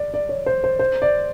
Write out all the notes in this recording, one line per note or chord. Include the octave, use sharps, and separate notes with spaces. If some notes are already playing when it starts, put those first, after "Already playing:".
Already playing: D5
D5
C#5
C5
C5
C5
D5